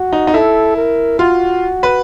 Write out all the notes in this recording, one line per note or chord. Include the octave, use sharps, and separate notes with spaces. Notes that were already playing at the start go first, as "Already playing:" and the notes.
Already playing: F#4
D#4
D#4
E4 A4
A#4
F4 F#4
B4